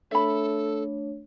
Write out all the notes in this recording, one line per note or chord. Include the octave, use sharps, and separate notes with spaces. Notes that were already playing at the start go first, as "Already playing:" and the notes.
A3 D4 A4 C#5 E5 B5